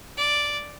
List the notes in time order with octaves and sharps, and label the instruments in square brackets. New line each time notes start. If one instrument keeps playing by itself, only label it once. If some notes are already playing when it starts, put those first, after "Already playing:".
[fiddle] D5